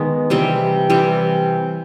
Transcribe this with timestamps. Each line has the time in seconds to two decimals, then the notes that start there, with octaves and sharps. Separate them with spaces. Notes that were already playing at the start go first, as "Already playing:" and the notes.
Already playing: D#3 G#3 B3
0.30 C3 E3 G3 C4
0.90 C3 E3 G3 C4